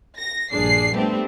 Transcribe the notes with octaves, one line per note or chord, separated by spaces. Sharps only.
A#6
A#1 G2 D4 G#4 C7
G3 A3 B3 C4 D4 G4